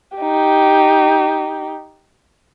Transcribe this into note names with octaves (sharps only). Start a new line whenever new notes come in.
D#4 G4